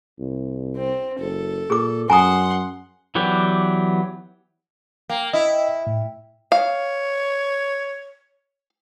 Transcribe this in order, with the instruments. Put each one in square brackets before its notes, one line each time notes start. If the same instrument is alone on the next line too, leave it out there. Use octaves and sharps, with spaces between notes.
[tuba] C2
[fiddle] C4
[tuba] F#1 [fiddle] A4
[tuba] A#2 [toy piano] G#4 D6
[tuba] F#2 [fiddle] F#5 C6 [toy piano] G#5 A#5 D#6
[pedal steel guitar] E3 F#3 B3 G4 D5
[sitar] A#3 [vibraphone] G5
[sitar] E4 [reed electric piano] D#5
[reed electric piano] A2
[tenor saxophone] C#5 [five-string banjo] F5